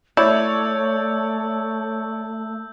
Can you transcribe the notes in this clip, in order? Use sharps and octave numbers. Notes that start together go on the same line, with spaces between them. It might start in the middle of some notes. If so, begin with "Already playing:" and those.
A3 E4 C#5 D5 E6 G6